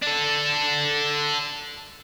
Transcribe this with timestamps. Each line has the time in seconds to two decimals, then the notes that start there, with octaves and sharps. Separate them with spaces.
0.03 D4 A4